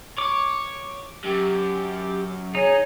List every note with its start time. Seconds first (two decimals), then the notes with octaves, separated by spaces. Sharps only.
0.18 C#5 D6
1.24 F#2 G4
2.55 D#4 G#4 C#5